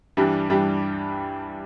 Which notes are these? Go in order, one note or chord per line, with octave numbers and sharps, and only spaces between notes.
G2 E3 G3 D4 G4
G2 E3 G3 D4 G4